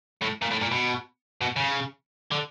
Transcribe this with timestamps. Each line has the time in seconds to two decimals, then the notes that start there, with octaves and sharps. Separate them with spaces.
0.21 A2
0.42 A#2
0.51 A2
0.61 A#2
0.71 B2
1.41 B2
1.56 C#3
2.31 D3